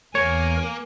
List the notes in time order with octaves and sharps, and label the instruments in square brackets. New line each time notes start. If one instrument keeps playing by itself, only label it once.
[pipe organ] E2 [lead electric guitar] A#3 [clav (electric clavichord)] C#5 [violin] G#5